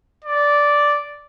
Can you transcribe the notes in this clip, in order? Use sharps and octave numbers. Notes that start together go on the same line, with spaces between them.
D5